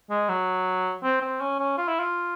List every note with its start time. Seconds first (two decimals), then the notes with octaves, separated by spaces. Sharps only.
0.10 G#3
0.29 F#3
1.03 C4
1.21 C4
1.41 C#4
1.59 C#4
1.77 F4
1.88 E4
1.99 F4